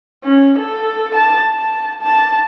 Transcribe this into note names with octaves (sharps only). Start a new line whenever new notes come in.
C#4
A4
A5
A5
A5